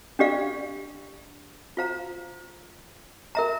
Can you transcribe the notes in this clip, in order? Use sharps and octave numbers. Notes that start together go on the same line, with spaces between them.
D4 G4 D5 F5
F4 C5 F5 A#5
A#4 E5 A#5